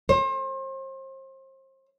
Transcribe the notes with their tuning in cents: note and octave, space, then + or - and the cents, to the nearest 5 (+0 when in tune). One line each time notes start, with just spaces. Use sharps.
C5 +35